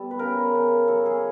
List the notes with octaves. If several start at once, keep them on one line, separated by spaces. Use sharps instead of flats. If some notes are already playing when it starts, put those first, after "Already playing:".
Already playing: G3 B3 A4
B4
C#3 A#4
C#3
F#3 A4
G#4